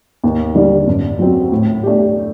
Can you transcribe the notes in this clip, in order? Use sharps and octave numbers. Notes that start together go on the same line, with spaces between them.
D#2
D3 G3 D4
F#2
F#3 C4 F#4
A2
A3 D4 G4